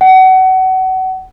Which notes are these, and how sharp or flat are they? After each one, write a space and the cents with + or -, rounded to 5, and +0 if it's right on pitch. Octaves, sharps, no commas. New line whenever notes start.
F#5 +30